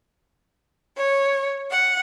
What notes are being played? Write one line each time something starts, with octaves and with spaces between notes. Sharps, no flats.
C#5
F#5